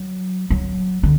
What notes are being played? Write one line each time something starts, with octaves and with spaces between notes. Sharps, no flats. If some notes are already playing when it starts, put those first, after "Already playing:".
Already playing: F#3
F#3
D3